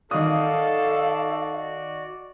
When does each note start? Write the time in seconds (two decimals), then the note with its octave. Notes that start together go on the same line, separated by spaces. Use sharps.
0.11 D#3 F#4 A4 D5 F5 D#6